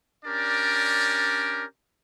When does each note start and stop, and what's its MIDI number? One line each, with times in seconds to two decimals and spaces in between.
0.24 1.63 61
0.24 1.63 62
0.24 1.63 67
0.24 1.63 70
0.24 1.63 74